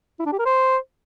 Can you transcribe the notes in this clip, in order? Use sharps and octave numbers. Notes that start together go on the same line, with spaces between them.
E4
D4
G4
A#4
C5